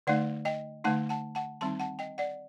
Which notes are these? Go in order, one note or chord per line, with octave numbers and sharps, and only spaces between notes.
D3 A3 D#4 D5 F#5
D#5 G5
D3 A3 D#4 F#5 A5
F#5 A5
F#5 A5
D#3 G3 C4 D#4 A5 C6
F#5 A5
D#5 G5
D5 F#5